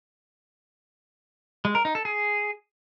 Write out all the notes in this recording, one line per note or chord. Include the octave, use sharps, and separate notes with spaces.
G#3
A#4
D#4
A4
G#4